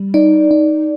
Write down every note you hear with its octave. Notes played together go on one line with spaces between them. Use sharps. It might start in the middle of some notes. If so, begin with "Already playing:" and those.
Already playing: G3
D#4 D5
D#4